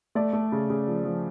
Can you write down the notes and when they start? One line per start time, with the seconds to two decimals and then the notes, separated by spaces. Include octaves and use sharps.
0.15 A3 D5
0.33 A3
0.52 C#3
0.70 C#3
0.88 F3
1.05 F3